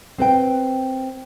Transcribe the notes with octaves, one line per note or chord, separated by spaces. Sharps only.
C4 B4 G5